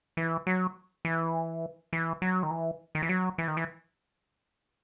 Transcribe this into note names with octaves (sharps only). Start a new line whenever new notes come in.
E3
F#3
E3
E3
F#3
D#3
E3
D#3
E3
F#3
E3
D#3
E3